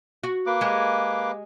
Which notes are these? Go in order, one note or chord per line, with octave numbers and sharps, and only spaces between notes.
F#4
A#3 B4 D6
G#3 G4